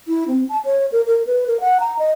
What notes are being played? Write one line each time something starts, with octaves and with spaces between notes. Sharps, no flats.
E4
C4
A5
C#5
A#4
A#4
B4
A#4
F#5
A#5
D#5